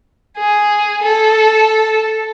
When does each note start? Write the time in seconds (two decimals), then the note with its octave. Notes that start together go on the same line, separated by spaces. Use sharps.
0.38 G#4
1.03 A4